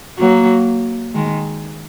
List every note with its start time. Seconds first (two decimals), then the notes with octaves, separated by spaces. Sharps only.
0.18 F#3 A#3
1.14 D#3 G#3